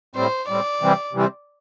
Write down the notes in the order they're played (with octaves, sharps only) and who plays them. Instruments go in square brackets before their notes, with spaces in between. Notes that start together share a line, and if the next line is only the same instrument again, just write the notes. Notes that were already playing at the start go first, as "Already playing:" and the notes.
[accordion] A2 G3 C4 [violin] C5
[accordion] A2 G3 C4 [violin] D5
[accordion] C3 E3 G3 C4
C3 E3 G3 C4